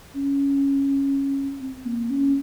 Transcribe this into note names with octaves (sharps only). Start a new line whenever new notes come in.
C#4
C4
A#3
C#4